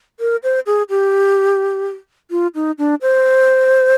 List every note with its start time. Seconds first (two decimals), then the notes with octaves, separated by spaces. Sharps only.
0.20 A#4
0.43 C5
0.66 G#4
0.89 G4
2.31 F4
2.55 D#4
2.78 D4
3.02 C5